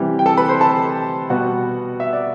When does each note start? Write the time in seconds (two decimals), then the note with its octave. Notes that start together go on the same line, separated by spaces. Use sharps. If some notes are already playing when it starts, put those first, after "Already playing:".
Already playing: C3 E3 G3 G4
0.19 G5
0.26 A4 A5
0.37 B4 B5
0.49 C5 C6
0.61 A4 A5
1.30 B2 G3 B3 F#4 F#5
2.00 E5
2.13 D5